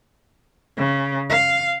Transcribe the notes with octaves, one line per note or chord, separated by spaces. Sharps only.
C#3
F5